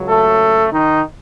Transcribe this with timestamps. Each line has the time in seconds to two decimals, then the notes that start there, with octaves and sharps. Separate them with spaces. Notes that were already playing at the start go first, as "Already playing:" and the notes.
Already playing: C#2 C#3 F#3
0.08 A3 A4
0.72 D#3 D#4